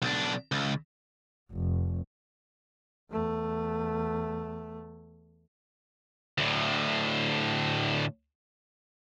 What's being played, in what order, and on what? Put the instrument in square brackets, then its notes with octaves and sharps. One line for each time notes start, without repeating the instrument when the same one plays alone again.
[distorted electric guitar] B1 D4
C#2
[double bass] F1
E2 A3
[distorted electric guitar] D2 A2